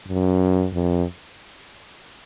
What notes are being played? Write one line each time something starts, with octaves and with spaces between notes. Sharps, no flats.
F#2
F2